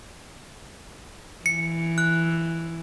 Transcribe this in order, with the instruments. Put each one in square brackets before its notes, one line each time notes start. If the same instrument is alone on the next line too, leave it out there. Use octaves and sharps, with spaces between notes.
[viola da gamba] E3 [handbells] C#7
[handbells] F#6